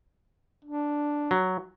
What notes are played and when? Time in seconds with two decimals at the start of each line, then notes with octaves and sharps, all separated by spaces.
0.64 D4
1.31 F#3